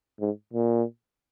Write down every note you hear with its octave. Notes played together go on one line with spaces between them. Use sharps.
G#2
A#2